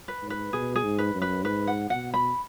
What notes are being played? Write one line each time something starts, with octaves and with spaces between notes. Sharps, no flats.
B4
G#2
B4
B2 G#4
G#4
G#2
B4
F#2
B4
G#2 B4
F#5
B2 F#5
B5